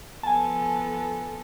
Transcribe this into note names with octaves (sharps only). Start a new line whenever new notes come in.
F3 B3 A4 G#5 A5